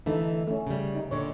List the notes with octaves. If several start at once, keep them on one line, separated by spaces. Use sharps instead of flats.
D3 E3 A3 D#4 A4
A3 C#4
C#3 G3
D#4
A#2 D3 C#5